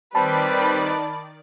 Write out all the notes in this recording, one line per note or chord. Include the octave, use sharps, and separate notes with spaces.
D#3 G3 C4 B4 D5 A5 B5